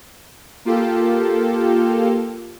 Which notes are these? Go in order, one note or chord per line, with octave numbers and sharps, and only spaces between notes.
A#3 F4 G4 A4